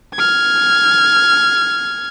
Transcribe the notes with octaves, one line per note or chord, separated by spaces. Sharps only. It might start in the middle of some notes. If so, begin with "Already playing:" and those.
F6 G#6